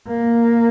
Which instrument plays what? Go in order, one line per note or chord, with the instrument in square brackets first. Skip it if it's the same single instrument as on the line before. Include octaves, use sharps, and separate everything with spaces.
[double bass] A#3